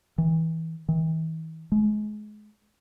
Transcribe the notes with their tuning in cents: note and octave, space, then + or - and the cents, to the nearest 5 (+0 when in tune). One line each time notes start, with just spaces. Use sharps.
E3 -25
E3 -45
G#3 +30